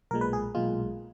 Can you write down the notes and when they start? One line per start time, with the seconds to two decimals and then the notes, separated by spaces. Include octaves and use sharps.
0.11 B1 A#2 G#3 A#4
0.21 B4
0.33 G#4
0.55 B1 A#2 G#3 F4